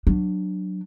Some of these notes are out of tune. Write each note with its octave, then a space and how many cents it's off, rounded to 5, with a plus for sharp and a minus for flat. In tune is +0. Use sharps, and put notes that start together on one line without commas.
F#3 +5 D4 +15